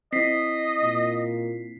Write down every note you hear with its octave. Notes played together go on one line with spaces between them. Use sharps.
C4 E4 D#5 B6 C7
A#2